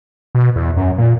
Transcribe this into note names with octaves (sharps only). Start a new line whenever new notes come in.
B2
E2
F#2
A#2